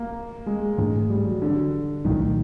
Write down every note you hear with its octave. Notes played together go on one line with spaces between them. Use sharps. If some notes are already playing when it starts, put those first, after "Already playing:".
Already playing: A#3
G#3
G#2 E3 A3 D4
G3
F#3
D3
C2 A#2 D#3 F#3 A3